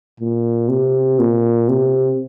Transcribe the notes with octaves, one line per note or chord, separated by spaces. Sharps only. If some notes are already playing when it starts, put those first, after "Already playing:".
A#2
C3
A#2
C3